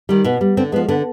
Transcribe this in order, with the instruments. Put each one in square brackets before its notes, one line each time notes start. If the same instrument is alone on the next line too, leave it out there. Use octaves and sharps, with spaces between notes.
[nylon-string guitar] D#3 G3
B2 B3
G3
D3 C4
G#3 B3
F3
D3 B3